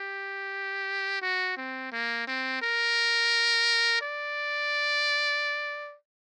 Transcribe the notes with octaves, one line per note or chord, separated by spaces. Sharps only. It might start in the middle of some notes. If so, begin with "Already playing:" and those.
Already playing: G4
F#4
C4
A#3
C4
A#4
D5